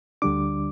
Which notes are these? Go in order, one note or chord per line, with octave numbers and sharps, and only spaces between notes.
D2 D3 G3 D4 D6